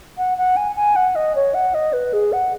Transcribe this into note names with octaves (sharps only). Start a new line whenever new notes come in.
F#5
F#5
G#5
G#5
F#5
D#5
C#5
F#5
D#5
B4
G#4
F#5